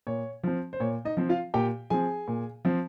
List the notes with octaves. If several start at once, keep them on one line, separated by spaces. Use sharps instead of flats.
A#2 C#5
F3 C4
C5
A#2 C#5
D#4 D#5
F3 C4
F4 F5
A#2 G4 G5
F3 C4 G#4 G#5
A#2
F3 C4